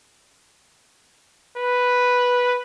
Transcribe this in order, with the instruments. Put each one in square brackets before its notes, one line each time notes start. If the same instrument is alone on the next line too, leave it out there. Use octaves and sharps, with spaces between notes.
[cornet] B4